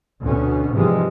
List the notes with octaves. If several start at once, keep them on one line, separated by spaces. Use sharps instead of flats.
D2 B2 C#4
G#2 C3 E3 F3 G3 G#3